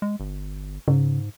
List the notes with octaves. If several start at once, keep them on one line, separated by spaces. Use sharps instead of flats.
G#3
G1
G#2 C#3